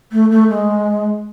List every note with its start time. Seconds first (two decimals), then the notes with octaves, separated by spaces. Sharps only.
0.12 A3
0.31 A3
0.49 G#3